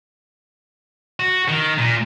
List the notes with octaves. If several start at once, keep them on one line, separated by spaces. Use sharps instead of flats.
F#4
D#3
A#2